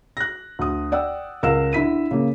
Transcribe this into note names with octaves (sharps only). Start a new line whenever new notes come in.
F#6 A#6
D2 D#6
D5 F#5 G5 E6
C#2 A#4 F5 F#5 E6 E7
D3 E4 B6 D#7
C#3 A#3